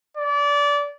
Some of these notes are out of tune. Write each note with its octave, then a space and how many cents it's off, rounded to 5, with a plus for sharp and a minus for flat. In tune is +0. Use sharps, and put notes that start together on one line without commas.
D5 -25